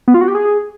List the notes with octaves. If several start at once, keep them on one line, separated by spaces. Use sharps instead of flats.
B3
F4
F#4
G4
G#4